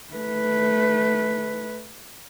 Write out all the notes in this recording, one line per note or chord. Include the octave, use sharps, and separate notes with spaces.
A3 B4